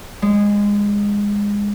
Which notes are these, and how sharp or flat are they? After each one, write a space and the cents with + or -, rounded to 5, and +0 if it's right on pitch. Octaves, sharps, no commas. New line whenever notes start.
G#3 -20